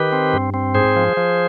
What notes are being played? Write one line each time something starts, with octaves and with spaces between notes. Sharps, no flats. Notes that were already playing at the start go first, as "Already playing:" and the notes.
Already playing: D#3 G4 B4
C4
G2
C4
G#2 G#4 C5
F3
F3